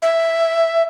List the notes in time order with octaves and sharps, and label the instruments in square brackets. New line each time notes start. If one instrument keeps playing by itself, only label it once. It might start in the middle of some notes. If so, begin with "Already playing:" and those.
[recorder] E5